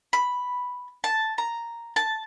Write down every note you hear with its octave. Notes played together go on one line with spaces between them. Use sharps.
B5
A5
A#5
A5